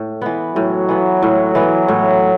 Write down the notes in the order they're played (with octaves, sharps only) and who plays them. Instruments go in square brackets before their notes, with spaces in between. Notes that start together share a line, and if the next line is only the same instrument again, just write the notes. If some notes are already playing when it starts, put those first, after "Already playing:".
Already playing: [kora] A2
E3 B3
[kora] A2 [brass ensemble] F#3
[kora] E3 B3
A2
E3 B3
A2